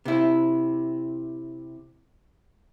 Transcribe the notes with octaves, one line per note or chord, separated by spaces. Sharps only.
C3 E4